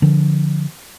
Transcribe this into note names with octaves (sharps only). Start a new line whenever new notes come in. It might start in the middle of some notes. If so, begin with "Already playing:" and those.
D3 F3